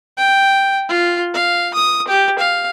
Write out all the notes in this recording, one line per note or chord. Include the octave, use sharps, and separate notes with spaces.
G5
F4
F5
D#6
G4
F5